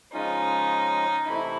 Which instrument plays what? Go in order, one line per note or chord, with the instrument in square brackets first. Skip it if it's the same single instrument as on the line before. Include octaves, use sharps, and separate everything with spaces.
[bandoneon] C#3 F3 G#3 C#4 F4 [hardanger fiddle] D#4
[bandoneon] C3 E3 A3 [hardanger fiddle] E4